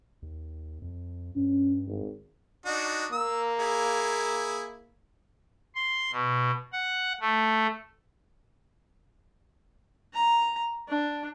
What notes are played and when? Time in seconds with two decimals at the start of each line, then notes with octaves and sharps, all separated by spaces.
0.22 D#2
0.82 F2
1.36 G2 C#4
1.87 G#1
2.66 D4 D#4 F#4
3.12 A#3 E6
3.60 E4 G#4
5.75 C6
6.12 B2
6.73 F#5
7.21 A3
10.14 A#5
10.88 D4